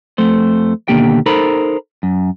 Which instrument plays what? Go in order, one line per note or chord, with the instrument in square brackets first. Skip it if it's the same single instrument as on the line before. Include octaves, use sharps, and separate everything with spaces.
[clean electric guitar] F2 A3 C5
D#2 B2 D3 A#3 G4 G5
D#4 A4 A#4 C5 A#5 B5
F#2